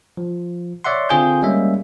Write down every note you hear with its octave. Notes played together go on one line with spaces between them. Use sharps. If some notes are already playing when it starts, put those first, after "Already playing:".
F3
C#5 D5 E5 F#5 C6
D3 C4 F4 G#4 G#5 G6
G3 G#3 A#3 C#4 E5